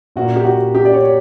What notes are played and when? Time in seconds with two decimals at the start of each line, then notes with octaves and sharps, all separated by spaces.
0.16 A#2 A#3 F#4
0.36 G4
0.45 F#4
0.75 G4
0.85 D5
0.94 C#5